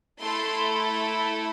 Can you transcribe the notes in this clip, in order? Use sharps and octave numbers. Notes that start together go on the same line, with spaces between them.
A3 E4 A4 C6